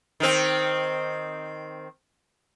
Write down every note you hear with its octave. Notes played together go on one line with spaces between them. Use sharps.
D#3 C4